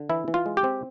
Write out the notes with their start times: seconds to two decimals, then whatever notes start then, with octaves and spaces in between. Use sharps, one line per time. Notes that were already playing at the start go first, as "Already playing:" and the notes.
Already playing: D3
0.09 E3 E4
0.28 E3
0.34 F4
0.46 G#3
0.57 G4
0.64 C4